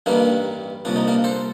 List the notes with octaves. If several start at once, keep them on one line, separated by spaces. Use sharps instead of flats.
A1 G2 D#3 G3 A#3 D4
C2 A#2 F3 D4
D#4
A#3 D4
A4 C5